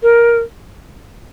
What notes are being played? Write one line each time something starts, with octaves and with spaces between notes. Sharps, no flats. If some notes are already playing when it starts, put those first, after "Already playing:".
A#4